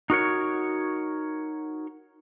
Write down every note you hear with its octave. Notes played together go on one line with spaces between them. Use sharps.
D#4 F#4 A#4 C#5